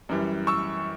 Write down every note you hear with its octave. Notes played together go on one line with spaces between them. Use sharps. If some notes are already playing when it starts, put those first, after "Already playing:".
F#2 E3 G3
C#6 E6